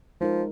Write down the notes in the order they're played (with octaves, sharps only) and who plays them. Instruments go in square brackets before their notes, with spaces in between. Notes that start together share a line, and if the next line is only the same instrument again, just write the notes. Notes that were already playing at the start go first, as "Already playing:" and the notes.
[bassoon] F3 [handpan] G#3 D#4 A#4